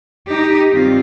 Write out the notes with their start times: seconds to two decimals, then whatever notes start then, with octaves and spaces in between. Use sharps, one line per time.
0.29 D#4 G4
0.71 G2 D#3 C4 F4